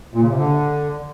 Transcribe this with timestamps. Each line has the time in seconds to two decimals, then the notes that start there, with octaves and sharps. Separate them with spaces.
0.14 A#2
0.21 C#3
0.29 C3
0.36 D3